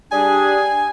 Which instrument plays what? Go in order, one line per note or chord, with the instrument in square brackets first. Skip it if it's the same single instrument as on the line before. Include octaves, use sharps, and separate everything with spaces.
[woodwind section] G3 D4 G#4 [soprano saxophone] G#5